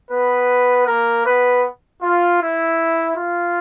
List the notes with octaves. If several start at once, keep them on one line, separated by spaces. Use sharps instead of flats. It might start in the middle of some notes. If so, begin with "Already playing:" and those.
B3 B4
A#3 A#4
B3 B4
F4
E4
F4